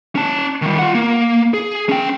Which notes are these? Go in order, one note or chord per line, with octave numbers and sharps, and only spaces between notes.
C#4 A5
D#3 G3
F4 F#5
A#3
G#4
C#4 G5